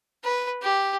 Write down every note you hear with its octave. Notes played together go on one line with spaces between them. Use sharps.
B4
G4